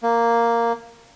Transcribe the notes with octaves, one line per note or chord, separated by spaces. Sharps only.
A#3